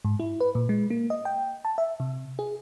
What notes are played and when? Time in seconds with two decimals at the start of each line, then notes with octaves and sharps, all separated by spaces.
0.05 G#2
0.20 E4
0.41 B4
0.55 A#2
0.69 G#3
0.90 A#3
1.10 D#5
1.25 G5
1.65 A5
1.78 E5
2.00 C3
2.39 G#4